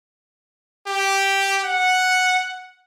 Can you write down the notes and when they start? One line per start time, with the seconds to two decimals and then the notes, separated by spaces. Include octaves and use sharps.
0.87 G4
1.64 F#5